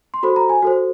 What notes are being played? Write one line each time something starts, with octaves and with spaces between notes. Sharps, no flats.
C6
F#4 A4 C5 B5
A#5
G#5
F#4 A4 C5